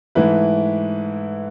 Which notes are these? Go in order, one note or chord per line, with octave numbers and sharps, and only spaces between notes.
G#2 E3 A3 E4 B4